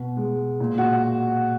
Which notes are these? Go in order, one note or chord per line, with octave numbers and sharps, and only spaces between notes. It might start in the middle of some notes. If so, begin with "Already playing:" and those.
Already playing: B2
G#3
A#2
F#4